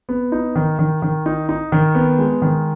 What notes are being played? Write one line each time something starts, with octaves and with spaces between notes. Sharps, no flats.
B3
D#4
D#3
D#3
D#3
D#4
D#4
D#3
B3
G#3
D#3